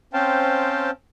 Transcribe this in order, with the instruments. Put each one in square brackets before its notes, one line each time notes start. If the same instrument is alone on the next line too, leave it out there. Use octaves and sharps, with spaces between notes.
[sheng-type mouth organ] C4 C#4 C5 F5 G5 A5